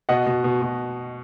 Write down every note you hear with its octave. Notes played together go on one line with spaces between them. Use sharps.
B2 D#5 F#5
B2
B2
B2